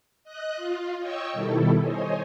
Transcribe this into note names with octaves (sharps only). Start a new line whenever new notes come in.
D#5 F#6
F4
C#5 D#5 G5 C#6 E6
B2 D#3 G3 E4 A4
C5 C#5 D#5 G#5